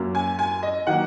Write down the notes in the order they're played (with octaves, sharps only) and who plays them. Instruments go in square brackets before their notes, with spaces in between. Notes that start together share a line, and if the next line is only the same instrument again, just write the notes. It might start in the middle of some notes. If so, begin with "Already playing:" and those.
Already playing: [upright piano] F#2 F#3 A#3
G#5
G#5
D#5
D#3 F#3 A#3 F#5